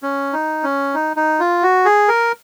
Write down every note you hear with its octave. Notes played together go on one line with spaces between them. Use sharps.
C#4
D#4
C#4
D#4
D#4
F4
F#4
G#4
A#4